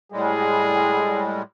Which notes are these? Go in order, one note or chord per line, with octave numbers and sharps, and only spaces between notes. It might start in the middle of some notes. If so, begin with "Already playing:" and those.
A2 G3 G#3 G#4